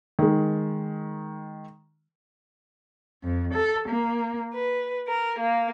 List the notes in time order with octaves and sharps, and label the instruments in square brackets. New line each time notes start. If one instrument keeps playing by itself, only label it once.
[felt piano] D#3 G#3
[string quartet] F2
A4
A#3
B4
A#4
A#3